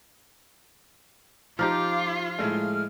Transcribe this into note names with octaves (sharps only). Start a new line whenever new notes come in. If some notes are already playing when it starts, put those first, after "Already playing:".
F3 D#4 F4 G4 D6 F6
A2 G#3 A3 F6